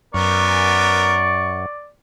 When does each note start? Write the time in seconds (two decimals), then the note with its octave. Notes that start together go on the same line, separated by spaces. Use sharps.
0.14 F#2 B3 A#4 D5 C#6